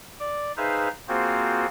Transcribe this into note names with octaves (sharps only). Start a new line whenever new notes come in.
D5
D#4 G#4 B4 C5 E5 F5
A#3 C4 F4 F#4 G#4 C5